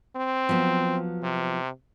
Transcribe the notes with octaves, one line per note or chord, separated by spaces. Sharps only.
C4
F3 F#3 B3
C3